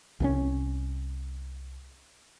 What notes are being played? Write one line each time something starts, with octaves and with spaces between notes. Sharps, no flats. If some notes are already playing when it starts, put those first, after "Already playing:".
C2 E3 C#4